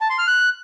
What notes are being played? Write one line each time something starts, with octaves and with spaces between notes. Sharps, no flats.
A5
C6
F6
F#6